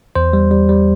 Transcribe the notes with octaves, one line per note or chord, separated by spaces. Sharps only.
E2 C5
G3
G3
G3